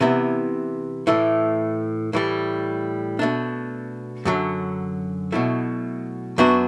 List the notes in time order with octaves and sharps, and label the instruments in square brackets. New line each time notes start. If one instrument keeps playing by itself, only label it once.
[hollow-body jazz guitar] C3 E3 B3 E4
A2 E3 A3
A2 E3 G3
B2 A3 D4
F#2 D3 F#3
B2 F#3 A3 E4
F#2 F#3 B3 D4 F#4